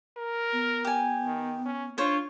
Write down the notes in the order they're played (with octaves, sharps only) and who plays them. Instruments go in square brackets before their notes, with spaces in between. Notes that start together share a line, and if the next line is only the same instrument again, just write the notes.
[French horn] A#4
[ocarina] B3
[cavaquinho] G4 G#5
[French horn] D#3
C#4
[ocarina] D4 [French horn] F4 [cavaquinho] C5 C#5